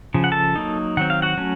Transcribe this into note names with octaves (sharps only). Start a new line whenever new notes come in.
C#3 F3
F#5
A4 A5
F#3 A#3 D#4
D#3 F#3 C4 F#5
F5
F#4 F#5
F#3 A3 C#4